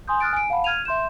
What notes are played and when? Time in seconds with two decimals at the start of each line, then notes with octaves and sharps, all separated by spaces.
0.08 G#5 C6 D#6 G6
0.20 D#6 F6 F#6 A6 D7
0.33 G#5 D7
0.50 F5 F#5 A5 B5
0.64 F6 G#6 D#7 F7
0.85 E5 C6 G6 E7